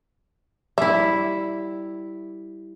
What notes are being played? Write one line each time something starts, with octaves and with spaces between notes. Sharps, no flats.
G3 E4 E5